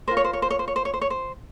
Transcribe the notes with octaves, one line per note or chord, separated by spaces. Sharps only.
F4 A#4 C5
C#5
C5
C#5
C5
C#5
C5
C#5
C5
C#5
C5
C#5
C5